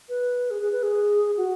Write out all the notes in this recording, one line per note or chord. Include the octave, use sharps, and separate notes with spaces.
B4
G#4
G#4
B4
G#4
F#4